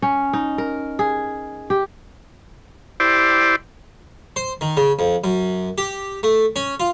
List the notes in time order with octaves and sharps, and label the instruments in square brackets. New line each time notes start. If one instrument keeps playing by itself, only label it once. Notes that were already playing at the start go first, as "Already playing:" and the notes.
[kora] C#4
D#4
A#4
G#4
G4
[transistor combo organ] E4 G4 C5 D5
[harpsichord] C5
D#3
C#3
F2
F#2
G4
A3
C#4
F4